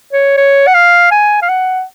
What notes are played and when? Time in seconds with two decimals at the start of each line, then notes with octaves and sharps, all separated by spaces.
0.13 C#5
0.37 C#5
0.67 F#5
0.74 F5
1.11 G#5
1.42 F5
1.49 F#5